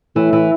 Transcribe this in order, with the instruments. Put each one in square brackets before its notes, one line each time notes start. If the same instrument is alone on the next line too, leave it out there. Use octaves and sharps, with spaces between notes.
[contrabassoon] A2 [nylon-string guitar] E3
[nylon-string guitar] E3